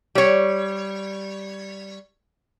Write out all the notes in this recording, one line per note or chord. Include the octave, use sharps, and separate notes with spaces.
G3 C#5